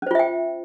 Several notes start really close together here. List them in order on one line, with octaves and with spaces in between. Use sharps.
C#4 C5 F4 E5 G5